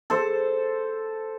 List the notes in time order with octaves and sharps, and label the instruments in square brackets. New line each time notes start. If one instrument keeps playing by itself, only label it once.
[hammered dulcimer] A4 C5